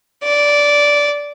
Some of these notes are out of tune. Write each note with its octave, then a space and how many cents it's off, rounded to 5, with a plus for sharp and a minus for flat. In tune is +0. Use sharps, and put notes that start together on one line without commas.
D5 -10